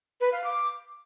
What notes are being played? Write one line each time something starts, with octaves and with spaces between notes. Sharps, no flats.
B4
F5
D6